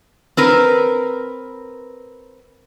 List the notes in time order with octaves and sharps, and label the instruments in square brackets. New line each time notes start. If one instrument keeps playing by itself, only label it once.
[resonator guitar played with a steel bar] C4 A#4 B4